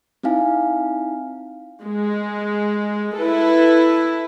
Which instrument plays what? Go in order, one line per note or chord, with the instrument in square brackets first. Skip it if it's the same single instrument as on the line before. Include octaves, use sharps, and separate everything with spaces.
[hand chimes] C4 D#4 E4 F5 G#5
[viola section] G#3
E4 A4 B4